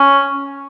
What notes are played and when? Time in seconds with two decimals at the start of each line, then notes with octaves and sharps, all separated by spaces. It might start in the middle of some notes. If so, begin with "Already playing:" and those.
Already playing: C#4